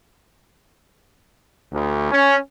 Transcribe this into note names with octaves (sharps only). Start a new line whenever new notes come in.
D2
C#4